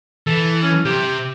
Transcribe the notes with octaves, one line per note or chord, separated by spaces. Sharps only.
E3 A4
C#4
C3 G4